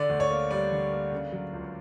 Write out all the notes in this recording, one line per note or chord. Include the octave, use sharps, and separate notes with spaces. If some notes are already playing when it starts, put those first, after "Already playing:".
Already playing: D3 D5
D2
C#5
A#3
G3 D5
D3
A#3
C#3
F#3
C#2